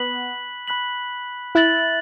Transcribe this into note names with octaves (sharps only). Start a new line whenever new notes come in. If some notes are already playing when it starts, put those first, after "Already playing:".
Already playing: B3 B5 F#6 B6 F#7
B5 F#6 B6 F#7
E4 F#6 A6 F#7